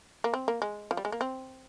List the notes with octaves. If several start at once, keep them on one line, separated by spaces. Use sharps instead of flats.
A#3
C4
A#3
G#3
F3
G3
G#3
A#3
C4